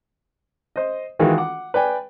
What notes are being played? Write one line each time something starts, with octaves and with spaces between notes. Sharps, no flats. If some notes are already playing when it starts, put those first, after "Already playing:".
C5 D#5
D#3 E3 G#3 D#4 F4 F#4
F#5 D6
B4 D5 G5 G#5